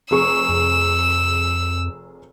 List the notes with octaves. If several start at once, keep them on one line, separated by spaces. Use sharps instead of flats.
F1 G#4 C#6 E6
F2